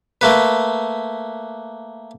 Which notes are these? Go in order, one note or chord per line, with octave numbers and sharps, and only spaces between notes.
A3 A#3 B4